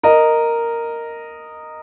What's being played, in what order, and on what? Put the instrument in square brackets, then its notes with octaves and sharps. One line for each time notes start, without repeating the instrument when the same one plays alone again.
[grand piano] A#4 D#5